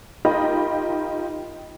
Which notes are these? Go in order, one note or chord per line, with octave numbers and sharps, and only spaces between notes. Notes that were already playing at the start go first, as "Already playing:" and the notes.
D#4 F4 G4 A#4 D#5 B5